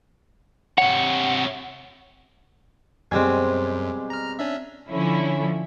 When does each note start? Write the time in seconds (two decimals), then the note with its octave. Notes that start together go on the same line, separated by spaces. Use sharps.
0.78 C3 C#5 F#5
3.12 F#2 B2 G3 G#3 C4 G#5
4.10 A#5 F6
4.39 C#4 D4 E5
4.88 D3 F3 C#4 E4